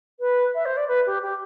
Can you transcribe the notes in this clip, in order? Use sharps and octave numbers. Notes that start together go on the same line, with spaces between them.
B4
E5
C5
D5
B4
G4
G4